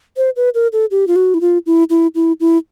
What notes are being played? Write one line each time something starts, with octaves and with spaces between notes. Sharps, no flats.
C5
B4
A#4
A4
G4
F4
F#4
E4
F4
E4
E4
E4
E4